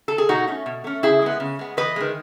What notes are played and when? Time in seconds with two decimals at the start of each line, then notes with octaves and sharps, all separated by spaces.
0.08 A4
0.18 G#4
0.29 B2 D#4 F#4
0.48 A3 C#4
0.66 B2
0.84 A3 C#4
1.03 C#3 E4 G#4
1.22 G#3 B3
1.40 C#3
1.59 G#3 B3
1.77 E2 B4 D#5
1.96 D#3 G#3